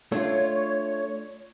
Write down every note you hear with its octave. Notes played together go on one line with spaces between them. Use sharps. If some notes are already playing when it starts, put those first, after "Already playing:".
A3 D4 F4 C#5